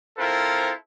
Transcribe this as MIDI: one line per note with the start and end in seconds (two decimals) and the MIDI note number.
0.18 0.71 60
0.18 0.71 64
0.18 0.71 65
0.18 0.71 69
0.18 0.71 70
0.18 0.71 72